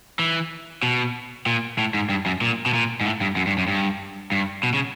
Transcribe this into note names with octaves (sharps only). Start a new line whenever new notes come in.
E3
B2
A#2
A2
G#2
G2
F#2
A#2
B2
A#2
G#2
A2
G2
F#2
G2
F#2
G2
G2
B2
C#3